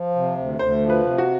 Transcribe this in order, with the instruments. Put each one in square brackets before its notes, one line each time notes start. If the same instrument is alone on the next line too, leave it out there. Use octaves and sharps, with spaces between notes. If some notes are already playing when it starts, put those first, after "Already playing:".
Already playing: [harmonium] F3
C3
D2
[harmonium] D2 [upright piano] C5
[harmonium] F3
[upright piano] B4
[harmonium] C3
[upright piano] F#4